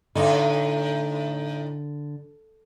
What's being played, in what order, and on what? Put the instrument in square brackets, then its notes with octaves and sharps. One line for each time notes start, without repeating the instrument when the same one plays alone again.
[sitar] A2 D#4 [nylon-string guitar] D3